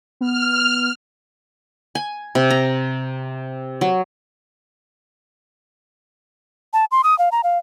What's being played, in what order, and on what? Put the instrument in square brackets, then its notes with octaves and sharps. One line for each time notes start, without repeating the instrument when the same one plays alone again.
[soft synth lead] B3 [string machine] F6
[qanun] G#5
C3
A#5
F#3
[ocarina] A5
C6
D#6
F5
A#5
F5